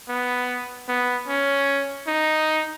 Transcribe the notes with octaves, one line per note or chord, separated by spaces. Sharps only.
B3
B3
C#4
D#4